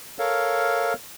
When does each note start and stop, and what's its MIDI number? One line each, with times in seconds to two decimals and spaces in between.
0.19 0.94 69
0.19 0.94 70
0.19 0.94 73
0.19 0.94 77